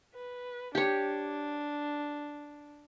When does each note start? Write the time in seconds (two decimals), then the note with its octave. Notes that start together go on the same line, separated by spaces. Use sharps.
0.15 B4
0.75 D4 G4 C#5